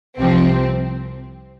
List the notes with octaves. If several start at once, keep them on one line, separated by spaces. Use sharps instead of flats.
C2 C3 F3 C4